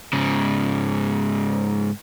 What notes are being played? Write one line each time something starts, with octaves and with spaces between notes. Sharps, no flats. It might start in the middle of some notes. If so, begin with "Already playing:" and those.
G#2 C#3